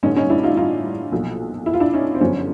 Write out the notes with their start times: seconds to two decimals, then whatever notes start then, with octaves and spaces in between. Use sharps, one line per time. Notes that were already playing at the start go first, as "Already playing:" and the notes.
0.03 A1 G2 D3 C#4 D#4
0.16 C#4 D#4
0.30 D4 E4
0.43 D#4 F4
0.57 D#4 F4
1.12 B1 A#2 F3
1.66 E4
1.73 F4
1.80 D4 E4
1.94 C#4 D#4
2.15 C4
2.21 G1 F#2 D3 F3 C#4